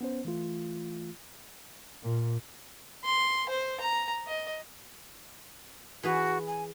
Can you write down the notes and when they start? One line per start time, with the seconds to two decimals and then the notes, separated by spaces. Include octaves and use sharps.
0.01 B3 C#4 C5
0.25 E3 A3 F4
2.03 A#2
3.05 C6
3.49 C5
3.81 A#5
4.27 D#5
6.03 E3 F#4 G#4 B4
6.47 G#5